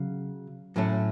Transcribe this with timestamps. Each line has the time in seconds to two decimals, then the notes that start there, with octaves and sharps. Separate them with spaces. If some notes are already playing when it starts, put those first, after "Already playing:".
Already playing: C#3 F#3
0.76 A2 F#3 A3 C#4